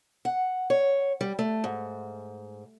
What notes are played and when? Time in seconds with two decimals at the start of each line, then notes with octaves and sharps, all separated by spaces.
0.25 F#5
0.70 C#5
1.21 G3
1.39 A3
1.64 G#2